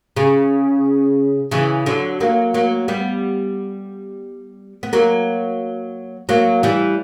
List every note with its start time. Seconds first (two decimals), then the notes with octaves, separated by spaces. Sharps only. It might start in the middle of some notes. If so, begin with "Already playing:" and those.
0.16 C#3
1.51 C#3 E3
1.86 D3 F#3
2.20 F#3 A#3
2.54 F#3 A#3
2.88 G3 B3
4.83 B3
4.93 F#3 A#3
6.29 F#3 A#3
6.63 E3 G3